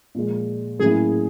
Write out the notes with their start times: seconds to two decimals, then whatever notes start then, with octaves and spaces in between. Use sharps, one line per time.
0.15 A#2 F3 G#3
0.80 A2 F#3 A#3 C#4 E4 G#4